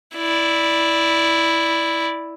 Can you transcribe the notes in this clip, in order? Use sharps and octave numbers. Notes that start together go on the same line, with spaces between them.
E4 D5